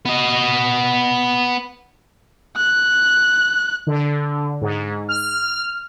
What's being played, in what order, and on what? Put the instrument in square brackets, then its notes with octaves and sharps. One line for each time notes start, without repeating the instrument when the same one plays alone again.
[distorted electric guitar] B3 D#5
[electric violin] F#6
[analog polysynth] D3
G#2
F6